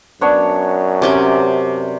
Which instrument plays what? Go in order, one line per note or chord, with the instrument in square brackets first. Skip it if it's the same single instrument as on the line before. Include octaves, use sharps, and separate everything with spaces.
[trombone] F#2 [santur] B3 D4 C#5
[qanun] C3 C#4 G4 [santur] D6